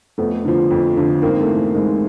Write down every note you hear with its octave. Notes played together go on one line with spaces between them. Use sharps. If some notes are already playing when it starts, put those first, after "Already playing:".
F2 A3 B3
D3 F3
F2
D3 F3
G#2 A#3 C4
A3
E3
G#2 G#3 A#3